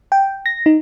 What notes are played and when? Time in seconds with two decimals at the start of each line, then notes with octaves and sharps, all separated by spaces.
0.12 G5
0.46 A#6
0.66 D#4